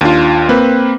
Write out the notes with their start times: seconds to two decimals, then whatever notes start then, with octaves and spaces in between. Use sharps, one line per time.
0.01 D#2 D4 F4
0.49 A#3 C4 B4